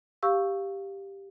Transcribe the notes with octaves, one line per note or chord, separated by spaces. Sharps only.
G4 F5 C#6 E6